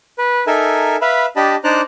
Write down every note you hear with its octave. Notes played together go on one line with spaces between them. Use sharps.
B4
D#4 A4 A#4 E5 G#5
B4 E5 F5 B5
D4 G4 D#5 A5 B5
D4 D#4 C5 D5 A#5 F#6